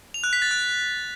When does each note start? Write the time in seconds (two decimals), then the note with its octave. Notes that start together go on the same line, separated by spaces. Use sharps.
0.14 F7
0.24 F#6
0.33 B6
0.42 A6
0.51 F#6